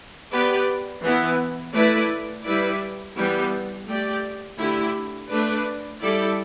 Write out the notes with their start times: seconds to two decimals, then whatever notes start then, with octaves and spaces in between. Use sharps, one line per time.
0.31 B3 G4 B4 D5
1.02 E3 B3 E4
1.74 A3 E4 B4 D5
2.44 G3 E4 B4 D5
3.16 E3 G3 B3 G4
3.87 A3 G4 D5
4.58 D3 A3 E4 G4
5.29 A3 D4 B4 D5
6.00 G3 E4 A4 D5